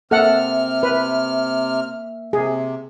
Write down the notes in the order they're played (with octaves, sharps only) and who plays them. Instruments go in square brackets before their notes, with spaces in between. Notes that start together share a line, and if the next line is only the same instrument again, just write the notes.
[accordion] C3 F6 [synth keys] A#3 E5 [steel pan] A4 F#5
[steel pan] B4
[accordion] C3 [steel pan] G#4